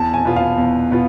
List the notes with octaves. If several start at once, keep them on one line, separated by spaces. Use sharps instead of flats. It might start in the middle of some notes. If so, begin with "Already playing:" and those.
Already playing: E2 A5
G#5
B2 B3 F4
F5
E2
B2 B3 F4